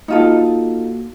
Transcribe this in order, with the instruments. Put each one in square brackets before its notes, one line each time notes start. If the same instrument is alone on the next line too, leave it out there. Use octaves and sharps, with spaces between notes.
[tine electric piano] A#3 F#4 [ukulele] D#4 F4 A4